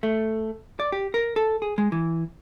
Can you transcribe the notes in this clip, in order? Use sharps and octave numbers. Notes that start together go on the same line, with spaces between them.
A3
D5
G4
A#4
A4
G#4
G#3
E3